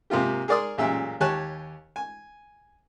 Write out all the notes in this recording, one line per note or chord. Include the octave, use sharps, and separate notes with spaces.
G#2 C3 A#3 F4 G4
G#4 A#4 D5 C6 D#6
A1 F#2 A#2 G#3 G4 E5
D#2 G4 C#5 G#5 A5 F#6
G#5